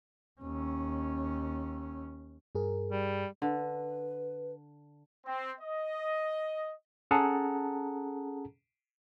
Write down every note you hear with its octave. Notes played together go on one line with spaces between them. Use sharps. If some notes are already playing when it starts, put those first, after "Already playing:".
D#2 C#4
G2 G#4 A#4
G3
D3 B4
C4
D#5
C#4 G#4 A4 F#5 A5 A#5